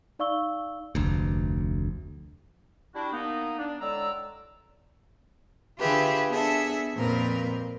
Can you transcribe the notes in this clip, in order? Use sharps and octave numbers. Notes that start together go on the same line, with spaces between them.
D#4 D5 F5 C#6 E6 G7
F1 D2
G3 D4 E4 F#4
A#3 B3 D#4
D4
A2 D3 G#3 D5 A#5 E6
D3 F4 G4 G#4 B4 E5
B3 D4 G#4 A4 E5
F2 A#2 C4 A#4 B4